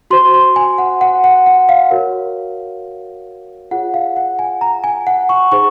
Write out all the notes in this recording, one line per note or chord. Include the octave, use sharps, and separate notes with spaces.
F#4 C5 C6
C6
G#5
F#5
F#5
F#5
F#5
F5
F#4 A#4 C#5
F4 G#4 C#5 F#5
F5
F#5
G#5
A#5
G#5
F#5
C#6
D#4 G#4 C5 C#6